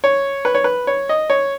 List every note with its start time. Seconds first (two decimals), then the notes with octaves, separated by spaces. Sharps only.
0.04 C#5
0.45 B4
0.55 C#5
0.64 B4
0.87 C#5
1.09 D#5
1.30 C#5